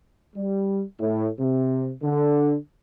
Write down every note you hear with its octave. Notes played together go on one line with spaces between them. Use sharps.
G3
A2
C3
D3